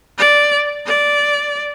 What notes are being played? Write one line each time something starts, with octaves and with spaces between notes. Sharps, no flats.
D5
D5